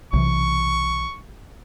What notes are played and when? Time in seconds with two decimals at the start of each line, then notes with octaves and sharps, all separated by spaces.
0.13 B1 C3 E3 C#6